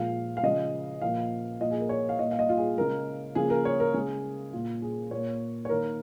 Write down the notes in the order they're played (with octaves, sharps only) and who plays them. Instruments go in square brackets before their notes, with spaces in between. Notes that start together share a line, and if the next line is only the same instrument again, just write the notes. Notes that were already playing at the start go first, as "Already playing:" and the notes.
Already playing: [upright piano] A#2 F3 G#3 F5
F5
C#3 F3 G#3 D#5
A#2 F3 A#3 F5
A#2 F3 A#3 D#5
G#4
A#4
C#5
F5
A#2 A#3 D#5
F5
D#5
F4
G#4
C#3 G#3 A#4
C#3 F3 A#3 G#4
A#4
C#5
A#4
C#3 G#3 G#4
A#2 A#3 F4
G#4
A#2 A#3 C#5
C#5
D#3 A#3 A#4